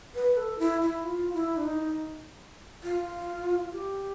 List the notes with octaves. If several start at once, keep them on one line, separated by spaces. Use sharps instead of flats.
B4
A4
E4
E4
F4
E4
D4
D#4
F4
G4